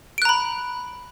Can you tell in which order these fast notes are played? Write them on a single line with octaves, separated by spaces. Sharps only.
D7 F#6 A#5 B5